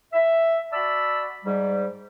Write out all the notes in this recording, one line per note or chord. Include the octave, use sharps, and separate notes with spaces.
E5
F#4 D5 A5 B5 E6
G#2 G3